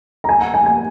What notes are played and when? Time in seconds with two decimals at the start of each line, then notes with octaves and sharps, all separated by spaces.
0.24 A#5
0.29 G#5
0.41 F#5
0.54 G#5
0.66 G#5